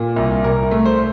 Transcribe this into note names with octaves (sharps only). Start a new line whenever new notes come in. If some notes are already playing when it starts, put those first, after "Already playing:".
Already playing: A#2
C2
C2 A#4
A3
C5